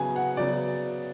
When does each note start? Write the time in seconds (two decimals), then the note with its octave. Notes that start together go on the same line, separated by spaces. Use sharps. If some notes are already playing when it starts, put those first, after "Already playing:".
Already playing: C#3 F#3 B3 G#5
0.16 F#5
0.37 C#3 F#3 B3 D5